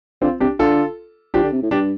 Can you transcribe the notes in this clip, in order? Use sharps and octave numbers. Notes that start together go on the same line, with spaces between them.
D3 C4 F4
C3 D4 G4
D3 F4 A4
F3 D4 G4
D3
C3
A2
G2 D4 G4